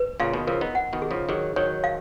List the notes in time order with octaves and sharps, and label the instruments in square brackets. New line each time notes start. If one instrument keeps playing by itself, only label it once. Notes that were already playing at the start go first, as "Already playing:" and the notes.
Already playing: [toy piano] B4
[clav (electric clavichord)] A#2 C#3 [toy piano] F5
[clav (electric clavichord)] B2 D#3
[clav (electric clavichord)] C#3 F3 [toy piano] A#4
[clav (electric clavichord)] B3 D#4
[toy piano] F#5
[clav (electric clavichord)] B2 D#3
[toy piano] G#4
[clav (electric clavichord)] C#3 F3
[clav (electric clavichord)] D#3 F#3 [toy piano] G#4
[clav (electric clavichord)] D#3 F#3 [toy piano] C#5
[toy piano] F5